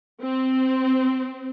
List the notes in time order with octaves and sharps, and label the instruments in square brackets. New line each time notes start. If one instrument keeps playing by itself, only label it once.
[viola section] C4